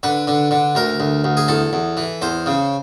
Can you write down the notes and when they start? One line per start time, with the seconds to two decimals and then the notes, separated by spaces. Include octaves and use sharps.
0.03 D3 B4
0.27 D3
0.51 D3
0.75 D2 A#4
1.00 D2
1.24 D2
1.37 G#4
1.48 E2 A4
1.73 E2
1.97 E3
2.22 E2 C5
2.46 C#3